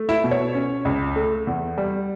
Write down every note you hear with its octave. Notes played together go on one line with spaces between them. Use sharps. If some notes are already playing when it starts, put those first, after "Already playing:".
Already playing: A3
E4 E5
B2
C#5
C#4
C#2
A3
E2
G3